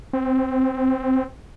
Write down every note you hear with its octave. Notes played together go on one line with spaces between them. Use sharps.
C4